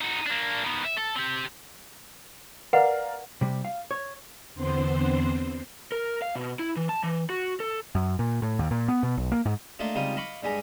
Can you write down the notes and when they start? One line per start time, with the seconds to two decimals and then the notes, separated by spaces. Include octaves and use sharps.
0.01 D#4 F#4
0.27 A#3 D4
0.64 D#3 B3
0.85 E5
0.97 A4
1.15 C4 G4
2.73 A#4 B4 D5 F5 F#5
3.41 C3 G3
3.65 F5
3.91 C#5
4.55 E2 D3 B3 C4 C5 C6
5.92 A#4
6.22 F5
6.35 B2
6.59 E4
6.76 E3
6.89 A5
7.03 E3
7.30 F#4
7.60 A4
7.95 F#2
8.19 A#2
8.42 A2
8.59 D#2
8.71 A#2
8.88 B3
9.03 B2
9.17 B1
9.32 A#3
9.46 G#2
9.79 A3 A#3 D4 F4 D#5
9.95 C#2 G3 C4 D#4 F4 D#6
10.16 D#5 F5 B5 C#6 D6
10.43 G2 G3 G#3 G#5 A#5